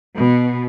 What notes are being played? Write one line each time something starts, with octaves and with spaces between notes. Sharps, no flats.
B2